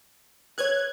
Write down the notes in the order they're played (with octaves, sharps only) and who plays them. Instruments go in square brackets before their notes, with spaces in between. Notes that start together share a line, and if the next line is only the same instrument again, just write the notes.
[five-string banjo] A4 B4 C#5 [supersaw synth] F#6 G#6